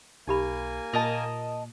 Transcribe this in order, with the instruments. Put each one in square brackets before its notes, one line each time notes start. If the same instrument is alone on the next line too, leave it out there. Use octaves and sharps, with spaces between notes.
[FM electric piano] B1 [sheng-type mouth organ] A#3 G#5 [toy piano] D#4 G4 B5
[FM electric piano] A#2 [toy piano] F4 [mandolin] A#4 D#5 A5